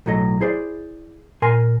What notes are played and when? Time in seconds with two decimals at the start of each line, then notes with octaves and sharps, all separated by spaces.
0.06 B1 A2 F#3 A4 D#5
0.41 E4 G#4 C5 D5
1.42 A#2 A#4 G#5 C6